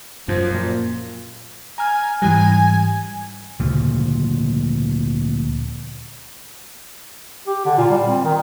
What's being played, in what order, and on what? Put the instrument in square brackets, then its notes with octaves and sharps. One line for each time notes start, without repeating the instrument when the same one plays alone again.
[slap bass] F#2 [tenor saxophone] F3
[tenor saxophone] A#2
[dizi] G#5 [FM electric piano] A#5 F6
[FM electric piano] G#2 E3 G3 [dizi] G#5
[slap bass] D2 A#2 C#3 F3
[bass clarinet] G4
D3
A#2
G3
C4
D#3